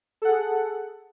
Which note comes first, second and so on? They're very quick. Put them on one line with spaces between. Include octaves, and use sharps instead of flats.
A4 F#5 G#4